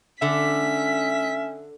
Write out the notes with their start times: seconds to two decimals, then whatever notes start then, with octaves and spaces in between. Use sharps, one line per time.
0.22 D3 C#4 E5 B6